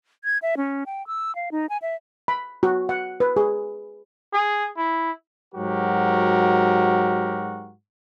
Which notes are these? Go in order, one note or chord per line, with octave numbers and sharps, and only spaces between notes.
G#6
E5
C#4
G5
E6
F5
D#4
G#5
E5
B5
F#4
F#5
B4
G#4
G#4
E4
G#2 F#3 F#4 G4 A#4